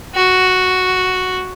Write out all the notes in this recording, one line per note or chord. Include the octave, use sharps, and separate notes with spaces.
F#4